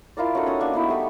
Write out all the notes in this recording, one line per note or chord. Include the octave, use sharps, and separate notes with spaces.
E4 F4 A#4 D5
C#4 D#4 F#4 A4
C#4 A4 D#6
A#3 D4 C#6 E6
B3 D#4 E4
G3 A3 B5